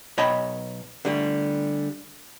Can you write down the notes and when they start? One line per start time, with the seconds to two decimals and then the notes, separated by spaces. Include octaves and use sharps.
0.18 B1 C#5 D#5 G5 A5 B5
1.05 D3 G3 A3